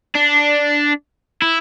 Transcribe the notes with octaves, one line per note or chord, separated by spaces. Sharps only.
D4
E4